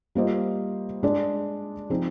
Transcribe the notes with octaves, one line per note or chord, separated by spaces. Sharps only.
G3 A#3 F4 C5 D#5
G#3 D4 G#4 D5
F3 C4 D#4 G#4